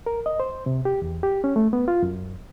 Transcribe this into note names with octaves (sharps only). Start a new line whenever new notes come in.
A#4
D#5
C5
C3
G4
E2
G4
C#4
A3
B3
F4
F#2